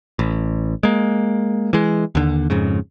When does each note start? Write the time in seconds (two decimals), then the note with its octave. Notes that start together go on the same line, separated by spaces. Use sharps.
0.19 A1
0.83 G#3 A#3
1.73 E3 G#3
2.15 D#2 D3
2.50 F2 G#2 C#3